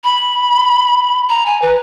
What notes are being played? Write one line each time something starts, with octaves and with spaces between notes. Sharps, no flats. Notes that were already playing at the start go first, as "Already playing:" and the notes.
B5
A#5
G#5
B4